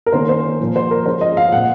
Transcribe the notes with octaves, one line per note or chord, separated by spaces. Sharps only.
A#4
D#3 A#3 C#4 C5
C5
A#2 F3 C4
C5
A#4
F3 G#3 C#4 C5
D#5
F5
A#2 F3 C4 F#5